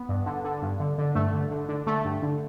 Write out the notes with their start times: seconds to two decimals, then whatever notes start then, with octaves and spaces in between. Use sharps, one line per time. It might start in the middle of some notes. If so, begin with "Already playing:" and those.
Already playing: B3
0.09 G2
0.26 D3
0.44 D3
0.62 G2
0.80 D3
0.98 D3
1.15 G2 A3
1.33 D3
1.51 D3
1.69 D3
1.86 D3 A3
2.05 G2
2.22 D3